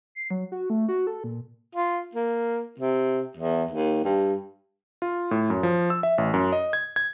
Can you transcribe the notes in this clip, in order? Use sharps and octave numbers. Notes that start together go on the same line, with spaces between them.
C7
F#3
F#4
A3
F#4
A4
A#2
F4
A#3
C3
E2
D#2
G2
F4
A2
F#2
F3
E6
E5
A1
F#2
D#5
G#6
G#6